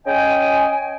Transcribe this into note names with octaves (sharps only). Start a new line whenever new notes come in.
C#4 D#5 G5 G#5